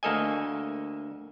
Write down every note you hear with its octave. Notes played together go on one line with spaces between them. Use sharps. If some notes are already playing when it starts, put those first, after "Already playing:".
D2 A#3 A4 D#5 G#5